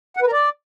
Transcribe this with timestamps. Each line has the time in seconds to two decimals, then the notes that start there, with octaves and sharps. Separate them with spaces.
0.17 F#5
0.22 B4
0.27 A#4
0.32 D5